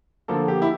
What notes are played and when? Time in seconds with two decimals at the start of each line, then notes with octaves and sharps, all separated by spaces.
0.28 D3 F3 A#3 A4
0.48 G4
0.62 E4